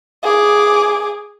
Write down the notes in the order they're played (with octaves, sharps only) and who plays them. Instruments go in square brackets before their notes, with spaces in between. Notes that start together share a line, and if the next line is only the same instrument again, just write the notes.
[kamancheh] G#4 D6